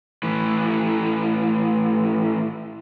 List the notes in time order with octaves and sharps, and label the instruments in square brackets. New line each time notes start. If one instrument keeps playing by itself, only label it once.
[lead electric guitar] A2 E3